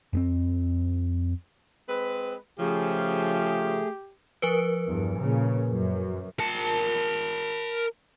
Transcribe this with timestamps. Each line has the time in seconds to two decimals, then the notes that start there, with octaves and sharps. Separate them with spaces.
0.13 F2 B3 C4
1.89 G#3 C4 B4
2.59 C#3 F3 A3 G4 G#4
4.42 F3 A#4 B4
4.86 E2 G2
5.18 A#2 C#3
5.70 F#2
6.39 A#4 A5